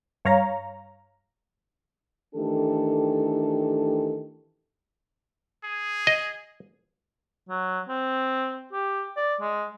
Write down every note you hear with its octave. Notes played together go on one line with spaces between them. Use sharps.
G2 C#5 F5 A#5
D#3 E3 A3 D4 G4 A4
G#4
D#5
F#3
C4
G4
D5
G#3